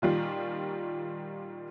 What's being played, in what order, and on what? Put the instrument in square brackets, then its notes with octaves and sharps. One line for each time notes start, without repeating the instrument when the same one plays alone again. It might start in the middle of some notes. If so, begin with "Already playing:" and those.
[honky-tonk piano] A#2 D#3 G3 F4